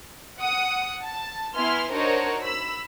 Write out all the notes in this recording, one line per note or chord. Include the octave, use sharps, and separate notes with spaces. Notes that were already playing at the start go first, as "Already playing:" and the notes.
F#5 D#6
A5
B3 E4 G#5 C6 F6
D4 D#4 F#4 A#4 C5 C#5
B5 E6